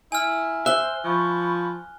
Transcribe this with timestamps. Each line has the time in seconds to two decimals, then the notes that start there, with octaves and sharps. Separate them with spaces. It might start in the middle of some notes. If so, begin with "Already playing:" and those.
0.12 E4 G#5 F6
0.66 C5 E5 F#6 G7
1.04 F3 B5 C#6